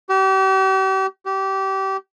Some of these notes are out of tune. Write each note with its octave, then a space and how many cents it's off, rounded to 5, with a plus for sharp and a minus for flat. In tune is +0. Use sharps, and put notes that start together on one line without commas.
G4 -40
G4 -25